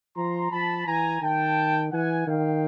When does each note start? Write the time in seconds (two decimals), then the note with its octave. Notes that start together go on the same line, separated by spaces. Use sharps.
0.16 F3 A#5 C6
0.51 F3 A5 B5
0.86 E3 G#5 A#5
1.22 D#3 G5 A5
1.93 E3 F#5 G#5
2.27 D#3 F5 G5